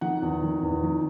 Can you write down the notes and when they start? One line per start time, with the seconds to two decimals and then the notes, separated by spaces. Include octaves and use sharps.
0.01 D#3 F#5
0.22 E2
0.43 D#3
0.63 E2
0.84 D#3